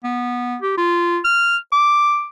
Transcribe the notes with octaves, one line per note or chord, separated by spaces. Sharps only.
B3
G4
F4
F6
D6